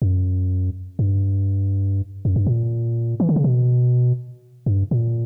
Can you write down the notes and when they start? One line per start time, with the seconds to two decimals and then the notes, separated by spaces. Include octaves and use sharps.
0.02 F#2
0.99 G2
2.25 F#2
2.36 G2
2.47 A#2
3.20 E3
3.29 D3
3.36 C#3
3.44 B2
4.66 G2
4.91 A#2